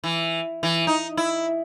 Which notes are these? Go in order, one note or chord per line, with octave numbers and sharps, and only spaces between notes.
E3
E3
D#4
E4